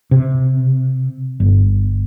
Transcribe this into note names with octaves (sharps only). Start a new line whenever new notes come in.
C3
G1